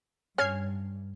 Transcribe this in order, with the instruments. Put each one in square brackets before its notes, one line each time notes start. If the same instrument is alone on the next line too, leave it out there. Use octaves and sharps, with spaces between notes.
[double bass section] G2 [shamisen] C#4 [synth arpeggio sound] F6 G#6 C7